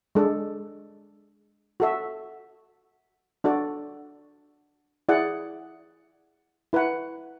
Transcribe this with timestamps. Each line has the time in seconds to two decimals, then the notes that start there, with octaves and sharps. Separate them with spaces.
0.15 G#3 D4 A4
1.80 F#4 A4 E5
3.44 D4 F#4 A4 D5
5.09 E4 G#4 D5 F#5
6.73 E4 B4 F#5